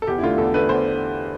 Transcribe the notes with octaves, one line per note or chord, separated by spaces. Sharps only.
A4
E2 G4
E4
D3 A3 F4
E2 A4
D3 A3 B4
E2 C5